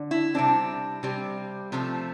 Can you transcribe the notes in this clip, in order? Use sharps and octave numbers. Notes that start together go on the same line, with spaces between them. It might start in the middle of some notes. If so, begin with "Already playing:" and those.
Already playing: D3
E4
C3 G3 C4 D4
C3 G3 C4
C3 F3 A3